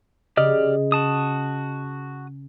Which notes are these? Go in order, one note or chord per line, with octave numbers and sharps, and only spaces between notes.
C#3 G4 D5 D#5 F6
F#4 A5 D#6